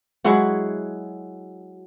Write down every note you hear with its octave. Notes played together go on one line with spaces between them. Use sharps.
F#3 G#3 E4 F#4